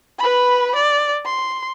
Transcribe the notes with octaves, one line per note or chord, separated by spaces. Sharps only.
B4 B5
D5
C6